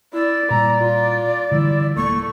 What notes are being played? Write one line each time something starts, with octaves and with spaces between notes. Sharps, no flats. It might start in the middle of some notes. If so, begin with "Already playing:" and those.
E4 D5
A#2 G3 A#5
F4
D3 E3 G3 E4
D#1 A3 A#3 C#6